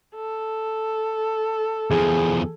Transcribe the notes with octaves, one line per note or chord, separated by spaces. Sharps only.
A4
E2 F3 G#4